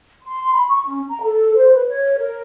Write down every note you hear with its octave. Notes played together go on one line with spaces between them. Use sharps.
C6
B5
C#6
C#4
A#5
A4
C5
B4
C#5
A#4